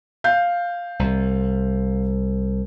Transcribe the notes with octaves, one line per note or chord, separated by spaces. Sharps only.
F5 G6
C2